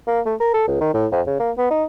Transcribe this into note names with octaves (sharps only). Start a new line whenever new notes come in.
A#3
A3
A#4
A4
C#2
D#3
A2
F2
C#3
A#3
B3
D#4